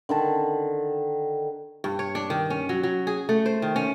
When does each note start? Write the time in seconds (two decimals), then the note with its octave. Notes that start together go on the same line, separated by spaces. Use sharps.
0.09 D3 D#3 A5
1.84 G2
1.99 C#5
2.15 D4
2.30 D#3
2.50 C#4
2.69 F#3
2.83 F#3
3.07 G#4
3.29 A3
3.46 C5
3.62 D#3
3.76 C#4